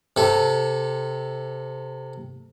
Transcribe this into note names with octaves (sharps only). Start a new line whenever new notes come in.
C3 A4